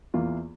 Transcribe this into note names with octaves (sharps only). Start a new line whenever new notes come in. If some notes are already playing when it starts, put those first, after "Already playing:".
E2 E3 A#3 F4